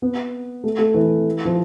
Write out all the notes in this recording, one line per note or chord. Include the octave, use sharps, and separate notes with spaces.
B3
A3
A3
E3
F3